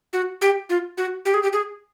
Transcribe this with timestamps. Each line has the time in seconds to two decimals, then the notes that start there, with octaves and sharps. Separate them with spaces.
0.13 F#4
0.42 G4
0.69 F4
0.98 F#4
1.25 G4
1.34 G#4
1.43 G4
1.53 G#4